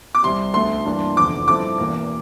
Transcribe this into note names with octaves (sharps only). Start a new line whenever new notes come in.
D6
C2 C3 G3 C6
D2 D3 A3 C6
G2 E3 A#3 D4
F1 E2 D3 F3 D6
G2 F3 C4 E4 A4 D6
E1 E2 E3 A#3